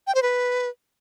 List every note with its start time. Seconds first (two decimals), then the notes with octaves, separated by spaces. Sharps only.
0.07 G5
0.15 C5
0.23 B4